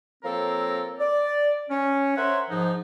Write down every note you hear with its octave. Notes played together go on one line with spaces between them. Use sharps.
F3 A#3 C4 A4 A#4 C#5
D5
C#4
A#4 C5 C#5 E5 F#5 C6
G#2 F3 D#4